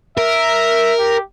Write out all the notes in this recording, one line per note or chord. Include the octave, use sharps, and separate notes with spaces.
A#4 E5
G4